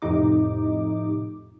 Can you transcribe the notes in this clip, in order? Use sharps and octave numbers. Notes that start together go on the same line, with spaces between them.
F2 A2 C3 D#4 D6